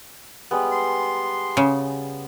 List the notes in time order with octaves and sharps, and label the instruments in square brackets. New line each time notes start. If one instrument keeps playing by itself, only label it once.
[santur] G3 G#3 B3
[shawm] C6
[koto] C#3